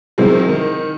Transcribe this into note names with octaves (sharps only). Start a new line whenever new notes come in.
C3 D#3 E3 F#3 G#3
D#3